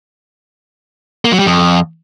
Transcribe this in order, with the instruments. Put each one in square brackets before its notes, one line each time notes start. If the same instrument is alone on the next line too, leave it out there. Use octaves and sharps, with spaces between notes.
[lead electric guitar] A#3
F#3
G3
F2